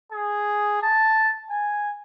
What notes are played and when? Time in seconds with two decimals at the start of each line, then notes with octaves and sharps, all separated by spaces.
0.12 G#4
0.82 A5
1.50 G#5